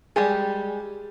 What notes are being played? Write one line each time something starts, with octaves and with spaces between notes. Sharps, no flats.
G3 G#3 G4 G#4